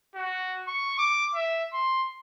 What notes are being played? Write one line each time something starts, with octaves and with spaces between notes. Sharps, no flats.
F#4
C#6
D6
E5
C6